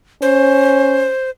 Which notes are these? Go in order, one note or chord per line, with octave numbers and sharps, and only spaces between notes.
C#4 C5